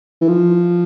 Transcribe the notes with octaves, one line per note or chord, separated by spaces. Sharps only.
E3
F3